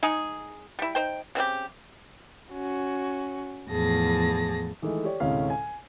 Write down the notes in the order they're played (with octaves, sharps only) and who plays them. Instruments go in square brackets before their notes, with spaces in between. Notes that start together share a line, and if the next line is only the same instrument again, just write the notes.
[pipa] G#3 D#4 G#4
G3 E4
D#4 C5 G5
C#3 C4 F4 G4
[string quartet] C#4 F#4
E2 A2 F3 G#4 A5 A#6
[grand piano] D#3 E3 G#3 A3
G4 C#5 D5
D2 A2 C3 G#3 C#4 F5
G#5